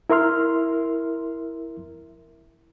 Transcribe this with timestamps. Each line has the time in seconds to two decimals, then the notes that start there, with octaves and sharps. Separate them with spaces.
0.10 E4 A#4 E5 C6 F6